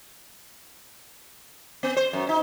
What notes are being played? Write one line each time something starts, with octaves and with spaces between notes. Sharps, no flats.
B3
C5
F#2
D#4